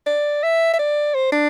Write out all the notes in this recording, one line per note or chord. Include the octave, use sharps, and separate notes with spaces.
D5
E5
E5
D5
C5
D4